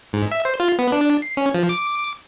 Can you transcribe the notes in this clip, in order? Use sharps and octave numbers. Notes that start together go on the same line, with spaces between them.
G#2
E5
C5
F4
B3
D4
C7
C#4
F3
D6